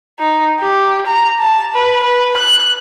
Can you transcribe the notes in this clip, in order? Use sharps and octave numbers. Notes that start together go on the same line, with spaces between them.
D#4
G4
A#5
A5
B4
B4
F#6